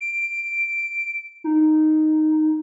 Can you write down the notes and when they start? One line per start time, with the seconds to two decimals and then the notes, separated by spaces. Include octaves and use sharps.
0.01 D7
1.44 D#4